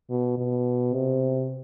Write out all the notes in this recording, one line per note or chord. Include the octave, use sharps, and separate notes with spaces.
B2
B2
C3